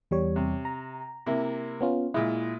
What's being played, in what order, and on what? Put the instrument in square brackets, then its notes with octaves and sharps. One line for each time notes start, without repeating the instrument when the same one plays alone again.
[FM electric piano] E2 G3 C#5
[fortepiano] C3
[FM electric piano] A#5
[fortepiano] C3 A#3 E4
[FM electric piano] B3 C#4 F4
[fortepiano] A#2 G#3 [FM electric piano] E4